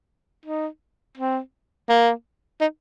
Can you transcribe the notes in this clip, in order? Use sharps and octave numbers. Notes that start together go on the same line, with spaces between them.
D#4
C4
A#3
D#4